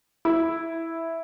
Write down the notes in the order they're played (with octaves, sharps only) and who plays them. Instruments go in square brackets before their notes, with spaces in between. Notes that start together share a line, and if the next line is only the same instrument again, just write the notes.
[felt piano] E4